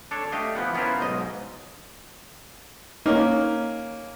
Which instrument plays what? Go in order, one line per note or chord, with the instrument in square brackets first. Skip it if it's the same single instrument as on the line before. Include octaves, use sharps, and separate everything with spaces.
[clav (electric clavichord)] D4 A4 C#5
A3 D4 G4 D#5 F5
E3 F3 B3 F#5
B3 C#4 E4 F4 A#4 C5
B1 G#2 D#5
[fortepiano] A#3 C#4 [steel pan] D#4